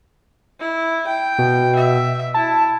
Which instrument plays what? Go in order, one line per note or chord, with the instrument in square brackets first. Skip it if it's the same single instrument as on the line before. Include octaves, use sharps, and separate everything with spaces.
[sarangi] E4
G5
[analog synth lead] B2
[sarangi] E5
[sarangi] E4 [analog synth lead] A5